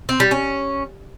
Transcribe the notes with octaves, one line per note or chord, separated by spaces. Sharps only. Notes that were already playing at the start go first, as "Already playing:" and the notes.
C4
G3
C#4